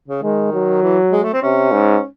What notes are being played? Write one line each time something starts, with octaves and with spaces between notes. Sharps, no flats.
C#3
D#3 G#3
F#3
E3
G#3
A3
C4
C3 C#4
G#2